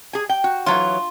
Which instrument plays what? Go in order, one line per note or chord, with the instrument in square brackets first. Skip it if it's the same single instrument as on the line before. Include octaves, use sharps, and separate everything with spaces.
[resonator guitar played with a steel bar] G#4 G#5
G5
F#4
[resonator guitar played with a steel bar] E3 F#3 C#5 [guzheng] F4